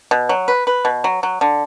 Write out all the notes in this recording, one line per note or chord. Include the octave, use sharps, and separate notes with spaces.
B2
F#3
B4
B4
B2
F#3
F#3
D3